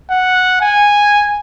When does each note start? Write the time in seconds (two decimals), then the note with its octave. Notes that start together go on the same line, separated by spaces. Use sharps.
0.10 F#5
0.61 G#5